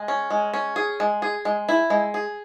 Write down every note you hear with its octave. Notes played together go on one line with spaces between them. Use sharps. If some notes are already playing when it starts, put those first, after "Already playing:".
Already playing: G#3
C#4
G#3
C#4
G#4
G#3
G#4
G#3
E4
G#3
G#4